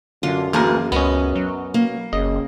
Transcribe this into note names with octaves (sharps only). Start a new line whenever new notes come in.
F#2 D3 F4
D2 E3 A#3 G#4 A#4 A5
C#2 B3 C#4 D#5
F#3
A#3
F#1 C#3 D#5